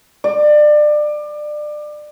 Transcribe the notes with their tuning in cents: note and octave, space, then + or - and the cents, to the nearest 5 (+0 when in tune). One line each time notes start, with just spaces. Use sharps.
D5 +25